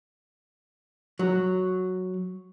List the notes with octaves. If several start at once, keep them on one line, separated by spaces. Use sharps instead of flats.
F#3